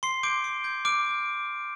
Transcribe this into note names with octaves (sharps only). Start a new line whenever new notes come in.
C6 C7
D6 G6 D7
C6
G6
D6 F6 D7